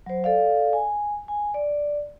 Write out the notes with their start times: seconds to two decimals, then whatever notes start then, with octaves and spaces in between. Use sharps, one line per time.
0.06 F#3 C5
0.24 A4 D5 F5
0.73 G#5
1.28 G#5
1.54 D5